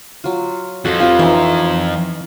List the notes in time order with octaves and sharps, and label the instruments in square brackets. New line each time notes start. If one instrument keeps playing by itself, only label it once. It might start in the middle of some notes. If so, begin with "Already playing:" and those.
[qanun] F#3 F4
[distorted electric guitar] F2 F3 [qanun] F#4 A4
[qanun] G3 C4 [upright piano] F4
[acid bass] E3 [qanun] C#4 D#4 E5